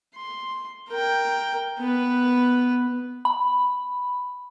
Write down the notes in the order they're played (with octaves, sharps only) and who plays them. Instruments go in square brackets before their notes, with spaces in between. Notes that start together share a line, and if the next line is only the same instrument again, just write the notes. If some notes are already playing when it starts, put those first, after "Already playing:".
[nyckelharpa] C6
A#4 G5
B3 B4
[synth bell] B5